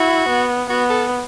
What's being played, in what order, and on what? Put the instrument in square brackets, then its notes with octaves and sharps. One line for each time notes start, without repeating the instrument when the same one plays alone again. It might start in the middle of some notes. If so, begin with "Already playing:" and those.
Already playing: [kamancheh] E4 [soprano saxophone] F#4
[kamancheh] B3
[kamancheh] B3 [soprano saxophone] F#4
[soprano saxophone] A4